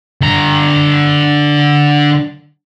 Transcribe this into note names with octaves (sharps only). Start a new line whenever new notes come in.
D3 A#5